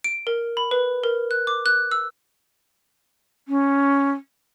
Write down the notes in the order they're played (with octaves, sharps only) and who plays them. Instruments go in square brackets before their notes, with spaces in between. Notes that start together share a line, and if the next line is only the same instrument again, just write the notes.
[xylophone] D7
A#4
B5
B4
A#4
F#6
D6
F#6
E6
[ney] C#4